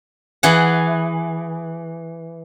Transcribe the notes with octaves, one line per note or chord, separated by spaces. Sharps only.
E3 G#4 F#5